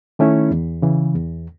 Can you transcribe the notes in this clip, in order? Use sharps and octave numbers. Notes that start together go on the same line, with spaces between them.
D#3 A3 C#4 E4
E2
C#3 E3
E2